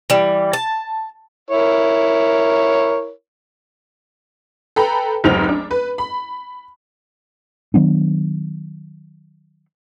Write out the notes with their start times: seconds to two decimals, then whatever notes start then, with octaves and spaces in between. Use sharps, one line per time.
0.10 E3 G3
0.53 A5
1.51 E4 A#4 C#5
4.76 A4 B4 G5 A#5 B5
5.24 F1 C#2 G#2 F#3 C4 F7
5.49 D4
5.71 B4
5.98 B5
7.74 D#3 F#3 B3 D4